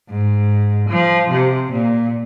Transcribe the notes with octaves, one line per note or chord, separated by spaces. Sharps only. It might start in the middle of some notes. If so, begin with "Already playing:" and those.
G#2
F3
C3
A#2